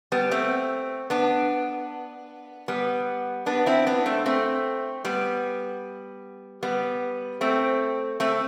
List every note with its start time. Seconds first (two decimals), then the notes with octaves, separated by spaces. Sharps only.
0.12 G3 B3
0.31 A3 C4
1.10 B3 D4
2.68 G3 B3
3.46 B3 D4
3.66 C4 E4
3.87 B3 D4
4.06 A3 C4
4.26 A3 C4
5.05 G3 B3
6.63 G3 B3
7.41 A3 C4
8.20 A3 C4